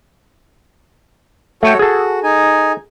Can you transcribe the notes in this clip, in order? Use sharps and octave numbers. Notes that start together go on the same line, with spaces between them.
A3 F#4 A4 C#5 G5
F#4 G#4 A4
D#4 G#5